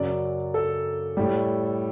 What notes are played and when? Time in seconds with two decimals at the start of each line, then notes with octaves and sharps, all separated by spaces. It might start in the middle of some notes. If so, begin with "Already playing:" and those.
Already playing: F#2 C#3 F#3 D5
0.54 A4
1.17 A2 G3